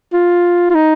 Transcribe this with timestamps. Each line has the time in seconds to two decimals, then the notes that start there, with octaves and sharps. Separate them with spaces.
0.13 F4
0.71 F4
0.75 D#4